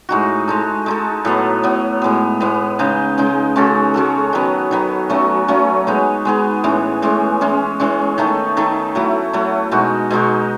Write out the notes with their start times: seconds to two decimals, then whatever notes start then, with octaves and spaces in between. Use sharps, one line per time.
0.09 A2 G#3 D#4 F#4
0.48 G#3 D#4 A4
0.86 G#3 D#4 A4
1.25 A2 F#3 B3
1.63 A2 F#3 B3
2.02 A2 G#3 B3
2.40 A2 G#3 B3
2.79 C#3 G#3 D#4
3.18 C#3 G#3 D#4
3.56 G#3 C#4 F#4 A4
3.94 G#3 C#4 F#4 A4
4.33 D#3 F#3 B3
4.71 D#3 F#3 B3
5.09 F#3 A3 C#4 F#4
5.48 F#3 A3 C#4 F#4
5.87 G#3 B3 D#4 G#4
6.25 G#3 B3 D#4 G#4
6.64 A2 E3 G#3 C#4
7.02 A2 E3 G#3 C#4
7.41 E3 G#3 C#4
7.80 E3 G#3 C#4
8.18 D#3 A3 D#4 A4
8.57 D#3 A3 D#4 A4
8.95 F#3 A3 E4
9.33 F#3 A3 E4
9.71 B2 G#3 D#4 F#4
10.10 B2 G#3 D#4 F#4